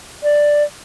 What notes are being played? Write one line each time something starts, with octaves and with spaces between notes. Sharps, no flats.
D5